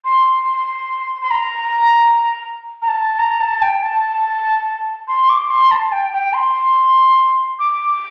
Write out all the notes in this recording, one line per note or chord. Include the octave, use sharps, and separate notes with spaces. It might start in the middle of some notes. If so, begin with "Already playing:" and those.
C6
C6
A#5
A#5
A5
A#5
A5
G5
A5
C6
D6
C6
A5
G5
G5
C6
D6